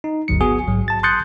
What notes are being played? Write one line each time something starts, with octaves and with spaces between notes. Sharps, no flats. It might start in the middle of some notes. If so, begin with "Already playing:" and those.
D#4
G1 D2 F#3 C#7
B3 F#4 G#4
A#1 G#2 F#3
A5 A6
C6 D#6 F#6 G6 A6 C#7